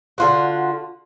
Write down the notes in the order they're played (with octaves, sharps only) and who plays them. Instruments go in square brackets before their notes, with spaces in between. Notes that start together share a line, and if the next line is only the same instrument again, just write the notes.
[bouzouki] D3 F4 F#4